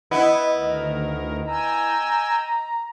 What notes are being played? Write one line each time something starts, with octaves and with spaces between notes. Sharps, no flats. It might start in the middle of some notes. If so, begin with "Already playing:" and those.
B3 E4 D#5
D2 D#3 A#4
G5 G#5 A#5 E6